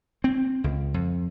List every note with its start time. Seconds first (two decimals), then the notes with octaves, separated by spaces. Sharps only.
0.24 C4
0.64 C#2
0.94 F2